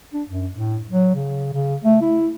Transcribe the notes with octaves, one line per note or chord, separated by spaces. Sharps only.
D4
F#2
A2
F#3
C#3
C#3
A3
E4